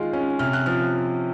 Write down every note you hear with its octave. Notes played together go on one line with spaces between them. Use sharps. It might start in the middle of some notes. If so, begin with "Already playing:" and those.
Already playing: D#3 G#3 F4
C#4
C3 F6
F#6
F3 F6